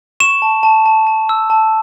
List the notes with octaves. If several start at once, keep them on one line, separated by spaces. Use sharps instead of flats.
C#6 E7
A5
A5
A5
A5
E6
A5